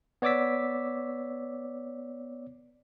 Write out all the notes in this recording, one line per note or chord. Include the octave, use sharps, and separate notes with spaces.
B3 C#5 D5 D6 E6 B6